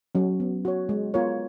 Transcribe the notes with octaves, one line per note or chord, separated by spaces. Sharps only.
F#3 C#4
B3
F#4 C#5
G#3
B3 F4 A#4 C#5